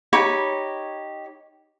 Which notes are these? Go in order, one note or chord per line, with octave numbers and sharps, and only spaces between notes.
D#4 G4 C#5 B5